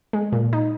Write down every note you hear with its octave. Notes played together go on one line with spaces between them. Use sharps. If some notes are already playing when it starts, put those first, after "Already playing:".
G#3
A#2
D#4